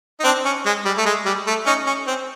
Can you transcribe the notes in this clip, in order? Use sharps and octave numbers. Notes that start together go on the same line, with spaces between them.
D#4
C4 D4
C#4
G#3
G3
A3
G#3
G3
A3
C#4 D#4
C#4
C4